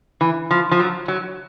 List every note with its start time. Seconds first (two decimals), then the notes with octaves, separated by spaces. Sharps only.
0.21 E3
0.51 F3
0.71 F3
0.80 F#3
1.08 F#3